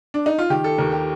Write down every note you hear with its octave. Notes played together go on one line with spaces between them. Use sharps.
D4
D#4
F4
D#3 G4
A4
D#2 A#4
G4